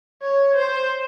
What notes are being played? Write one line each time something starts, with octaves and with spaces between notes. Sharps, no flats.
C#5
C5